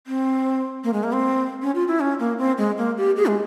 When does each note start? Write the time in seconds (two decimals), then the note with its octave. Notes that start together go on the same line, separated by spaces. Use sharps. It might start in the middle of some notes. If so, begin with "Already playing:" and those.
0.07 C4
0.84 A#3
0.93 G#3
1.04 A#3
1.12 C4
1.62 C#4
1.75 F4
1.88 E4
2.00 C#4
2.20 A#3
2.38 C4
2.58 G#3
2.78 A#3
2.97 G4
3.16 G#4
3.26 G#3